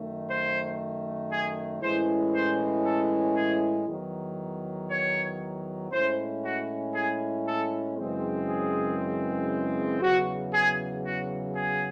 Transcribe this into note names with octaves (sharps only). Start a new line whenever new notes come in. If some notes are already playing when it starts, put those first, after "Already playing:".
Already playing: F#2 D#3 A3
C5
G#4
A2 E3 G#3 C#4 E4 C5
C5
A4
G#4
E2 D#3 F#3
C#5
A2 G#3 C#4 E4 C5
F#4
G#4
A4
F#2 C#3 E3 G#3 C4
G#4
E2 C#3 F#3 F#4
G#4
F#4
G#4